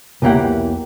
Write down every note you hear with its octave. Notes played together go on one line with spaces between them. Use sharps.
B1 E2 E3 A#3 G4 F#5